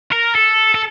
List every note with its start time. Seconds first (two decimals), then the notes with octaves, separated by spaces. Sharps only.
0.12 A#4
0.35 A4
0.75 A4